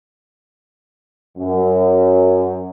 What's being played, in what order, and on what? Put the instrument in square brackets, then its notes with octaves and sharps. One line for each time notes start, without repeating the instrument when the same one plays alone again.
[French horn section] F#2